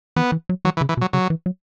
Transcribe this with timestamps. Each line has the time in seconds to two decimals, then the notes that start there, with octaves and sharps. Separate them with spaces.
0.16 E3 B3
0.32 E3
0.49 F#3
0.65 E3 F#3
0.77 E3
0.81 C#3
0.89 E3
0.97 B2
1.01 F#3
1.13 C#3 F#3
1.30 E3
1.46 F#3